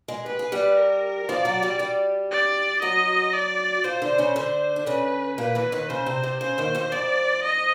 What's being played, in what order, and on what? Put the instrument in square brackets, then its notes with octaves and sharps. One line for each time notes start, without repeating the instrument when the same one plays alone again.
[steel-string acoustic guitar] G#3 G#4
[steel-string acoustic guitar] G4 [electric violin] B4
[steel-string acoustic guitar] G#4
G3 G4
[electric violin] A#4
[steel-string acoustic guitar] F3 F4 [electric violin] D5
[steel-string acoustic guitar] F#3 F#4
G3 G4
G3 G4
[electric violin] D5
[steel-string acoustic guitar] F#3 F#4 [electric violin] D#5
[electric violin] D5
[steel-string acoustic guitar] F3 F4 [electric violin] C5
[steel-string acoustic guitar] D3 D4
C#3 C#4
[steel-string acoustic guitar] D3 D4 [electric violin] C5
[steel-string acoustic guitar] D4
[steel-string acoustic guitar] C#3 C#4 [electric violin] B4
[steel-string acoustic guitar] A#2 A#3 [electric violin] B4
[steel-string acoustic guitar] E2 E3
D#2 D#3
[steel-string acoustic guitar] C#3 [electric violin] C5
[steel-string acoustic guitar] C3
C3
[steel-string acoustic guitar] C#3 [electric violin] C5
[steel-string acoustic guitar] D#2 D#3
D#2 D#3
[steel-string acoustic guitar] F2 F3 [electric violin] D5
[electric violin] D#5